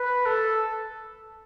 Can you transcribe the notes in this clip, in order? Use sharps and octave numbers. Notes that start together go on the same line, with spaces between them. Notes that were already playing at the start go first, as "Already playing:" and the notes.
Already playing: B4
A4